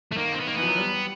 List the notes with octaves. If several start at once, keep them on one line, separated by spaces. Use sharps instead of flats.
A3
D#3 A#3
C4
B3
D#3 A#3
E3 B3
F3
F#3
G3
G3